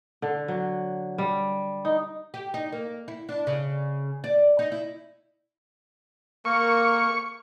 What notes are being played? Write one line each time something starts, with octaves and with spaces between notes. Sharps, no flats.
D3
F#3
G3
D#4
G4
D#4
A#3
E4
D4
C#3
D5
D#4
E4
A#3 A#4 C#6